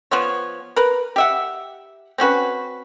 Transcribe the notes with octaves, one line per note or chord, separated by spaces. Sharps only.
F3 B3 F4 C#5
A#4 B4
G4 E5 F#5
C4 C#4 F#4 B4